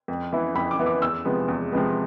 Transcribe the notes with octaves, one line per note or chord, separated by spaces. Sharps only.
F2
E3 B3 E4
F2 B5
D6
E3 B3 E4
D6
E2 E6
C3 F3 G#3 B3
E2
C3 F3 G#3 B3